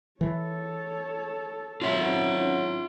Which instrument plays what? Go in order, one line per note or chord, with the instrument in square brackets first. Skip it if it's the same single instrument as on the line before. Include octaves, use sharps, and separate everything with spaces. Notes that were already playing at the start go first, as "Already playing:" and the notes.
[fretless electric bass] E3 [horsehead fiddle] A4 C#5
[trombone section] G#1 F#3 [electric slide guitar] F4 E5
[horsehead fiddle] C#4 E4